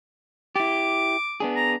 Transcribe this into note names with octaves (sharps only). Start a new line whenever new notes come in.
E4 G4 D6
B3 D4 G#4
A#5